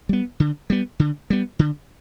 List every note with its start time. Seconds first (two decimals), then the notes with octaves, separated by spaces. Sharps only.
0.09 G3 B3
0.40 D3
0.70 G3 B3
0.99 D3
1.30 G3 B3
1.59 D3